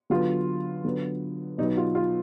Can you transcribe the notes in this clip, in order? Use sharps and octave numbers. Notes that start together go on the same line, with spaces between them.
D3 F#3 B3 F4
D3 F#3 B3
B2 F#3 B3 D#4
F4
F4